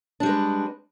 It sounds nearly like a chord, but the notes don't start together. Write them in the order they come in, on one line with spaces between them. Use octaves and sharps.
D4 G3 G#3 B4